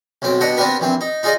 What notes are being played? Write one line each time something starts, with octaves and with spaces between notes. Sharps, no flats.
B1 F#2 C4 D6
B2 D4 G4 D#5 F#5
B3 C4 D4 G4 A#4 B4
A#1 E3 C4
D#4
D#4 F4 G#4 D5 D#5